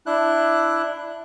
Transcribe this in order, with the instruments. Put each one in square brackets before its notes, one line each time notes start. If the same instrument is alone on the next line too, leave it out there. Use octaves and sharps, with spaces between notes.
[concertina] D4 E4 F#6